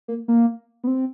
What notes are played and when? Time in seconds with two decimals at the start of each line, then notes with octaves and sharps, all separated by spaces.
0.08 A#3
0.28 A#3
0.84 B3
0.87 C4